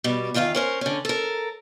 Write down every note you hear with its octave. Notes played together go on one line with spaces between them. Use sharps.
B2 G3
E2 D#3 F4 C5 F5
C#4 A#4 C5
D3 C#4
A4 A#4